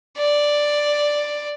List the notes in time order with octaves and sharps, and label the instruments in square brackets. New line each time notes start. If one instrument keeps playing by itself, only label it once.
[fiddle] D5